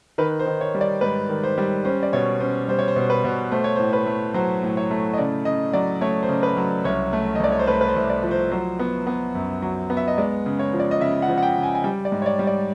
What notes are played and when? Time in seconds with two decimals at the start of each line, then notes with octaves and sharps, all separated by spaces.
0.18 D#3 B4
0.39 C5
0.46 D#3
0.61 C#5
0.75 G3
0.81 D5
1.01 G#2 B4
1.29 D#3
1.43 C5
1.58 G3
1.85 C#4 C5
2.03 D5
2.13 B2 C#5
2.40 C#4 C5
2.68 G3 C5
2.79 C#5
2.88 C5
2.96 B2
3.10 B4
3.24 B2
3.52 A3 C5
3.64 C#5
3.76 C5
3.79 A2
3.93 B4
4.07 A3
4.34 F#3 C5
4.63 A2
4.77 C#5
4.91 A3
5.13 D#5
5.18 C#3 D5
5.45 C#3 D#5
5.73 F#3 D5
6.01 A3 C#5
6.23 C5
6.29 C#3
6.43 B4
6.57 F#3
6.84 C2 C#5
7.13 A3
7.35 D#5
7.40 C2 D5
7.52 C#5
7.59 C5
7.67 A3 B4
7.81 B4
7.89 C5
7.96 C2
8.10 D5
8.23 F3
8.31 C5
8.51 F#3 C5
8.79 B3
9.07 B3
9.35 F#2
9.62 F#3
9.90 B3
9.97 E5
10.08 D#5
10.18 G#3 D5
10.46 C#3
10.59 C#5
10.73 F3
10.80 D5
10.91 D#5
11.01 C#3 E5
11.22 F#5
11.28 F3
11.38 F#5
11.43 G5
11.57 C#3
11.63 G#5
11.75 G#5
11.84 G3 G5
12.05 D5
12.12 G#2
12.22 C#5
12.26 D5
12.39 G3
12.47 D5